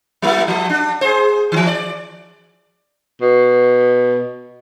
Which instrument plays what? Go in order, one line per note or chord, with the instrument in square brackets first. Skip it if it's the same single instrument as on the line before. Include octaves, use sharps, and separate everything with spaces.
[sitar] F#3 A#3 E4
F3
D4
G#4 C5
D#3 E3
D5
[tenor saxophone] B2